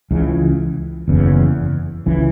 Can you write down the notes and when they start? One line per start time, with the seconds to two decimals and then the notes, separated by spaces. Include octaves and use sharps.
0.11 C#2 C#3 E3
1.08 F#1 E2 C#3
2.06 C#2 C#3 E3